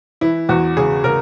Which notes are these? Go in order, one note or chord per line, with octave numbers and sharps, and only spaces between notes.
E3 E4
E2 F#4
C#3 G#4
C#3 A#4